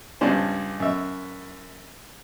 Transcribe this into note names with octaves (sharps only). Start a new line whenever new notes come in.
C#2 G2 C#4 D4 C5
F#2 E5